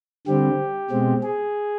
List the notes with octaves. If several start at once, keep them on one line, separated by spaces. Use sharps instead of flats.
D3 G3 C4 G4
B2 G#3 C4
G#4